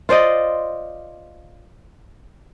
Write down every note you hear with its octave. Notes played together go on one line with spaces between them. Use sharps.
F4 C5 D5 D#5